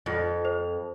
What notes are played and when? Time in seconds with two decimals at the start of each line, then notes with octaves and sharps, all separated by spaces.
0.06 F2 F4
0.45 C5